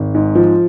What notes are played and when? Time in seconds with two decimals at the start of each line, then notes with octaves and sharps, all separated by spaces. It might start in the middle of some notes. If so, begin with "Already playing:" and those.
Already playing: G#1
0.15 G#2
0.35 F3